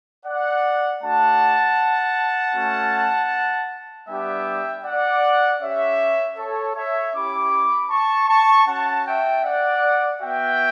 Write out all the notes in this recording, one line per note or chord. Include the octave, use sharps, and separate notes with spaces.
D5 F#5
A3 D4 F#4 F#5 A5
A3 C#4 F#4
G3 B3 D4 G4 E5 G5
D5 F#5
C#4 G4 C#5 E5
A4 C#5
C#5 E5
C#4 E4 G4 B5 D6
A5 C#6
A5 C#6
C#4 F#4 F#5 A5
E5 G5
D5 F#5
B3 F#4 E5 G5